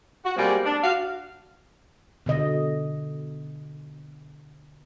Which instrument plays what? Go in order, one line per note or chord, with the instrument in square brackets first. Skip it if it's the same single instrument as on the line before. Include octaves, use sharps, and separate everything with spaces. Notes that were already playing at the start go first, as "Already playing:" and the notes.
[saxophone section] F#4
B2 G3 G#3 A#3 C4 G#4
D4
F#4 F5
[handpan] B2 D3 D#5